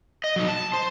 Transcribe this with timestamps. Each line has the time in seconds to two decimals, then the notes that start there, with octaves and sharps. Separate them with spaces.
0.24 D#5
0.36 F#3 D#4
0.48 A5
0.74 C5